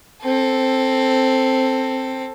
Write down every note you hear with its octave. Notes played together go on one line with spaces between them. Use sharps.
C4 A4